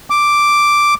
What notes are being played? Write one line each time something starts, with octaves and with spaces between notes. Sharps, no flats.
D6